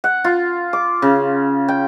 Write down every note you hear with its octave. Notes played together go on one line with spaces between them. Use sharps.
F#5
F4
D6
C#3
G5